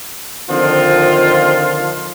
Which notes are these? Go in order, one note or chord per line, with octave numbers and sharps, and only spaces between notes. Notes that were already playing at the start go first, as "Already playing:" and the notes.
D3 D#3 F3 C4 F4